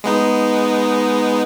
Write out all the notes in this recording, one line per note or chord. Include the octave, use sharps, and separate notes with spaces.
G#3 B3 D#4